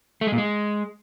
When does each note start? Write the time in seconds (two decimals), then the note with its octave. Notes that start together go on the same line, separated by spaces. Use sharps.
0.21 A3
0.27 G#3
0.32 A#2
0.38 G#3